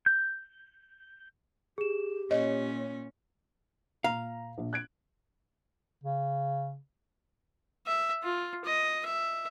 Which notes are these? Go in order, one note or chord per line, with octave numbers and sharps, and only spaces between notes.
G6
G4 G#4 E7
A#2 C#4 C#5 D#5
A#2 F5 A#5
A#1
F#6 G#6 D7
C#3
E5
F4
D#5
E5